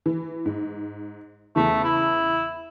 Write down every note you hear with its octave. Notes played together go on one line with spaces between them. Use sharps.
E3
G#2
E2 C#3 E3 A3
E4